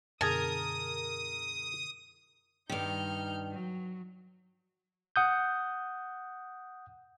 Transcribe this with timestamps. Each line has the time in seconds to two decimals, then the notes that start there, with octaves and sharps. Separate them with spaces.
0.21 F#2 B2 D3 G#4 A#4 G#5 A5 D#6
2.69 G2 D#3 D#4 F6 G6
3.51 F#3
5.16 F#5 D#6 G6